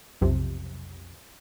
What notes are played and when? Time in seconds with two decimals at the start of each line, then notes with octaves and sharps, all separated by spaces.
0.21 B1 F2 C3